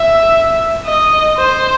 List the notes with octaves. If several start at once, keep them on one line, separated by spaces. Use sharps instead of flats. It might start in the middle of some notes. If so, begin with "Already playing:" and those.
Already playing: E5
D#5
C5